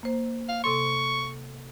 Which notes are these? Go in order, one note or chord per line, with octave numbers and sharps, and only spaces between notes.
A#3 C5
F5
C3 A4 C6 C#6